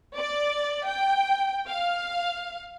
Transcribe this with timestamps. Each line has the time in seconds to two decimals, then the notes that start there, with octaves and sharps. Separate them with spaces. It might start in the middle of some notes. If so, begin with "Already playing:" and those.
0.16 D5
0.85 G5
1.68 F5